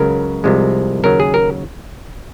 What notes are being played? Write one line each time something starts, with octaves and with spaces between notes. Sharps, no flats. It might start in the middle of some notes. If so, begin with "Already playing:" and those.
Already playing: C#2 C#3 F#3 A#4
C2 C3 F3 G#3
D#2 C#3 F#3 A#4
G#4
A#4